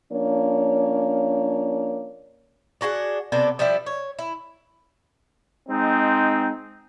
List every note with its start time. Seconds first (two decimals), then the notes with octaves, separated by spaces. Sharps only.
0.12 F3 A#3 C#4 D4 C#5
2.81 D4 F#4 G#4 F#5
3.32 C3 B3 D4 A4
3.59 F3 G3 D4 E4
3.86 C#5
4.19 E4
5.68 G#3 C4 D#4